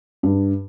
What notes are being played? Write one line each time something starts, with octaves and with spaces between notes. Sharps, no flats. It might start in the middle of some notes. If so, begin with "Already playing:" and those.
G2